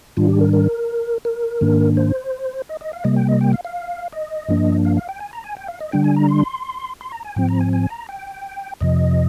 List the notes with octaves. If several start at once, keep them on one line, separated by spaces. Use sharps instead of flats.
G#2 D#3 G3 D4 F4
G4
A#4
A#4
A#4
G#2 D#3 A#3 D4
C5
D#5
D#5
F5
C3 G3 A#3 D#5
G5
D#5
G5
F5
F5
D#5
G2 F3 A#3 D4
F5
F5
G5
G#5
A#5
G#5
G5
F5
D#5
D3 G3 D4 G5
G#5
A#5
C6
C6
A#5
G#5
G#2 F3 C4 G5
A#5
G#5
G#5
A#5
G5
F2 C3 F3 D#5